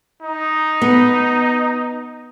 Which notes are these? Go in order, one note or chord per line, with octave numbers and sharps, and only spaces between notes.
D#4
B3